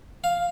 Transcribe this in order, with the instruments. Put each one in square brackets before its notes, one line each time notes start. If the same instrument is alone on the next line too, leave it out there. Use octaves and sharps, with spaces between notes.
[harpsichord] F5